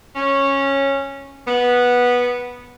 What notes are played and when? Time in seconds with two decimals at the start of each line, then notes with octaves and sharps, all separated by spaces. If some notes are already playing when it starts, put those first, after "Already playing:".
0.16 C#4
1.47 B3